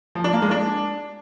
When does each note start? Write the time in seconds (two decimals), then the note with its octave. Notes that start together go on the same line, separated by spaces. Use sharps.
0.15 F3
0.24 D4
0.33 A#3
0.42 G#3
0.51 D4